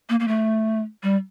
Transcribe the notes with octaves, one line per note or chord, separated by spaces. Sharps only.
A#3
A#3
A3
G3